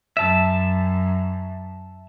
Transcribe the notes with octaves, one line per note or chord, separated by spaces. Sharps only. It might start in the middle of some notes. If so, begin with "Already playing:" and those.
F#2 E5 A5